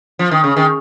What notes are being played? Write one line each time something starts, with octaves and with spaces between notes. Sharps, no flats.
F3
D#3
C#3
D#3